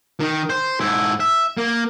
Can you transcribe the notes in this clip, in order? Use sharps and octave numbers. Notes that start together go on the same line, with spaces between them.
D#3
C5
G#2 E4
E5
A#3